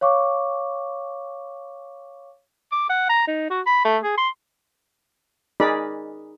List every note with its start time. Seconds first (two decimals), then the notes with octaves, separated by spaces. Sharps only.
0.01 C#5 F5 C#6 D6
2.72 D6
2.90 F#5
3.09 A#5
3.27 D#4
3.50 F#4
3.67 B5
3.85 A3
4.03 G#4
4.18 C6
5.60 D#4 G#4 A#4 D5 B5